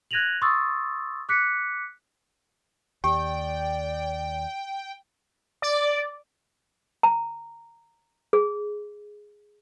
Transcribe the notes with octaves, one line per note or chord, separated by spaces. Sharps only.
F#6 G#6 A#6 D#7 F7 F#7
C6 C#6 D#6 E6 A6
D6 F#6 B6 C#7
D#2 G4 D5 G5
D5
A#5
G#4